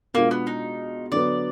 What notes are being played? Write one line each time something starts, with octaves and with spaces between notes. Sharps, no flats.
B2 G#3 A#3 D4 F4
B3
D#4
D3 F#3 B3 D5